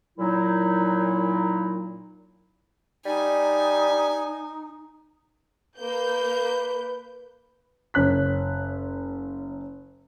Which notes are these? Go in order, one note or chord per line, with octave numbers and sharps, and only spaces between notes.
A#2 F#3 D#4 E4
G3 D#4 G#5
A#3 B4 G6
F#1 C#4 F#6 B6